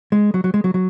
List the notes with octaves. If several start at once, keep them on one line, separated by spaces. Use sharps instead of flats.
G#3
F#3
F#3
G#3
F#3
F#3